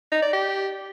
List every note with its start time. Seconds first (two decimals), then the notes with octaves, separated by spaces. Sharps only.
0.12 D#4
0.23 D5
0.33 G4